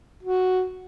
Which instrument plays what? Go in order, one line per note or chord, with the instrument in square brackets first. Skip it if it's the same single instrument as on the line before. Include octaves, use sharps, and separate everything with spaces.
[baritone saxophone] F#4